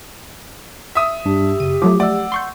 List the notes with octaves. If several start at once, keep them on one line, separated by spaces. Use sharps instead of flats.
E5 D#6
G2 G3 D4 G4
F#2 C#3 D#7
F3 F#3 A3 D6
A3 D5 F#5 E6
C6 C#6 G6